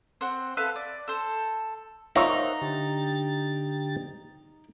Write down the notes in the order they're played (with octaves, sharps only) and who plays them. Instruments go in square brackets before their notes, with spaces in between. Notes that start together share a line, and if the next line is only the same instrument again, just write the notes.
[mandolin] C4 C5 F#5
A4 B4 E5 F5
D5
A4 C5
[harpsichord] D#4 [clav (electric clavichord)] F4 C#5 E5 [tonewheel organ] A#4 C5 F#5
[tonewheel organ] D3 G4 A6